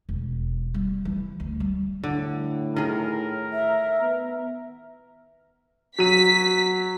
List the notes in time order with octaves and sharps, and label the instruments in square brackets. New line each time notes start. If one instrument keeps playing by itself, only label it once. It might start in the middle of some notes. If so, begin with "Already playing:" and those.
[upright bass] E1
G3
E3
D2
G3
[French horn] A2 [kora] D3
[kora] D#3 G#4 [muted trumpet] A#4
[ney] E5
[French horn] B3
[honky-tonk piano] F#3 D#7 [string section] B6